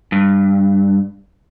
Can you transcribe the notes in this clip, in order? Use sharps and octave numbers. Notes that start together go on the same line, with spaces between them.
G2